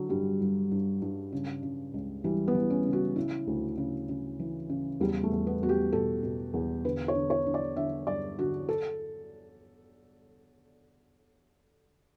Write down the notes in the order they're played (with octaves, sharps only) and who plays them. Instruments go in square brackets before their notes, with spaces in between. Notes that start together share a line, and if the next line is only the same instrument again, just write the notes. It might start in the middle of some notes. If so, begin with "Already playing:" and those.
Already playing: [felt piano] D3 F#3
G2 G3
G2
G2
G2
C#3
C#3
C#2
E3 G3
B3
E3
C#4
C#3
F#4
C#3 E4
D2
C#3
C#3
E3
C#3
E2 G3
A3
E2
B3
E2 F#4
G4
B2 A4
B2
E2
D3 B4
C#5
D3
C#5
D3
D5
D3 E5
G2 D5
D3 F#4
A4